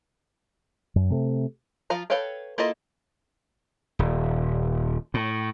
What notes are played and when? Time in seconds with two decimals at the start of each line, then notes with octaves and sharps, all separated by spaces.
0.96 F#2
1.10 C3 A3 C4
1.90 F3 F4 F5 A#5
2.10 A4 B4 C#5 F5 G5
2.58 A#3 E4 F4 A4 D#5
3.99 D#1
5.14 A2